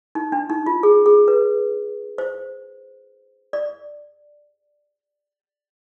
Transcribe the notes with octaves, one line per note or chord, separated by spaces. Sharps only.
D#4
D4
D#4
F4
G#4
G#4
B4
C5
D5